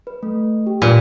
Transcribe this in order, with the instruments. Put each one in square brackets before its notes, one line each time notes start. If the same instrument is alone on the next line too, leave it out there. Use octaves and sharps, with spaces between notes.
[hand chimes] B4
A3
G4
[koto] A#2 [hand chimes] F4 B4 E6